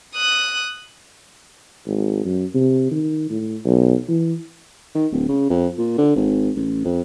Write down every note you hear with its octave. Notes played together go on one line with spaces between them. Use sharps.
D#6 F#6
G#1
F#2
C3
D#3
A2
B1
E3
D#3
D1
C#3
F2
A#2
D3
G#1
A1
F2